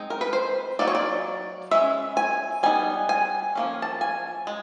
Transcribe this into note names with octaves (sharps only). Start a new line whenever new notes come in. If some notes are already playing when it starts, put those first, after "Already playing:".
Already playing: G#3 C4 D#4
A#4
B4
C5
F#3 A#3 D#4 D5
C#5
D5
G#3 C#4 E5
G#5
G3 B3 D#4 G#5
G#5
F3 A#3 C#4
A5
G#5
G#3